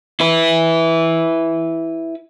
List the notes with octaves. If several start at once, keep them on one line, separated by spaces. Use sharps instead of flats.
E4 B4